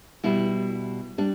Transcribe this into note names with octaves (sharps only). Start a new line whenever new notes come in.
B2 G3 E4
G3 D4